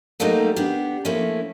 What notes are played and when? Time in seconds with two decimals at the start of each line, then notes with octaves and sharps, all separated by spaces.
0.20 F#3 G3 A3 A#3 C4 D#4
0.56 B3 D4 G4
1.05 F3 A3 A#3 C#4 E4